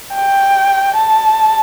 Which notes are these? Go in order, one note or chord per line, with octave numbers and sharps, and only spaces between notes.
G5
A5